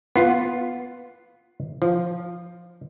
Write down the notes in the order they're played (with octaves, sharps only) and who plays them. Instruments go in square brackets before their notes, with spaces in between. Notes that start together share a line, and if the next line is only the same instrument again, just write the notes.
[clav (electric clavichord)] B3 F4
F3